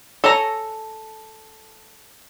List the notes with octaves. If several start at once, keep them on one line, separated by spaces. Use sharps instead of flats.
A4 C#5 G#5 A#5